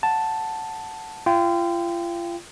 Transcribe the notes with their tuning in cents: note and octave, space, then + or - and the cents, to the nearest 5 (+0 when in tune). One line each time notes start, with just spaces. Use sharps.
F#5 +0 A5 +0
F4 -35 G5 +0